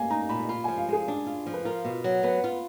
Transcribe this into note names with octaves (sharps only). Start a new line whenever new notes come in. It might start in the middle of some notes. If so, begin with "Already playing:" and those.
Already playing: A#3 G#5
D#4 A#5
A#2 B5
F4 B5
F3 G#5
F5
G#3 G#4
D4
F4
F3
B4
F4 A#4
B2
F#3
B3 B4
F4